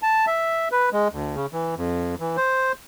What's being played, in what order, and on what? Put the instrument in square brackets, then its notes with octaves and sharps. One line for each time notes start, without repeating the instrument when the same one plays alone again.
[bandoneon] A5
E5
B4
G#3
D2
C#3
E3
F2
E3
C5